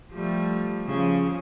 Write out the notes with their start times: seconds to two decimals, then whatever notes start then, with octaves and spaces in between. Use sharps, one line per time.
0.12 F3 G3 A3
0.86 C#3 F3